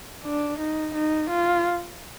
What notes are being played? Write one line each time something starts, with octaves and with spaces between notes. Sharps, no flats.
D4
D#4
D#4
F4